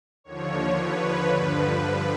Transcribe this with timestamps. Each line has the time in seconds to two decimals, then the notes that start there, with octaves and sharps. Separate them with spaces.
0.24 D#2 D3 F3 C#5
0.77 B4
1.30 G2 D3 F3 B4